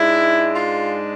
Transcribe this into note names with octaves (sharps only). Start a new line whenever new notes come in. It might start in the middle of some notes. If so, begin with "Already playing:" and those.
Already playing: G#2 G#3 D4 E4
F4